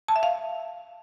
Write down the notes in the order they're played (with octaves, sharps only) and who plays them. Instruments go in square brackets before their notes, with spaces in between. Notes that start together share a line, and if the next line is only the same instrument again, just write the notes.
[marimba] A5
E5
F5